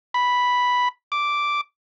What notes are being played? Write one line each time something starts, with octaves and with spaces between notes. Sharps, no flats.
B5
D6